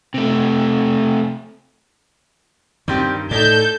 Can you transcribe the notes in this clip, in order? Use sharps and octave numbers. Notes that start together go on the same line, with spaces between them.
C3 A3
G2 D#3 G3 C4 G4
A2 D#4 A4 C#5 D5 G6